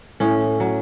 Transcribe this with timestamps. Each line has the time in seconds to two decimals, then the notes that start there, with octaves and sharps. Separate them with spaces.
0.20 A2 C#4
0.60 F#3